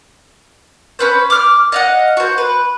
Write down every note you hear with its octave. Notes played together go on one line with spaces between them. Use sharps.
C#4 B4 C5
D6 F6
D#5 F5 F#5
F#4 C5
B4